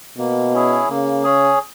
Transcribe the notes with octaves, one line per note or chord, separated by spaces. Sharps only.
B2 A#3
C#4 E4 G#4
C#3 A#3
C#4 G#4